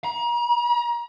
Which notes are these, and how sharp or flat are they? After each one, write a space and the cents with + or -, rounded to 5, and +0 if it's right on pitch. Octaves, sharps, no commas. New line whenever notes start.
A#5 +35